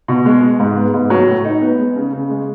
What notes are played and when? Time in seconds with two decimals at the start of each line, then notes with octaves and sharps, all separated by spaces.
0.08 B2
0.26 G#3
0.42 G#3
0.60 G#2
0.77 B3
0.94 G#2
1.10 F#3
1.28 A2
1.45 D#4
1.61 B3
1.79 G#3
1.96 C#3
2.13 C#3
2.30 G#3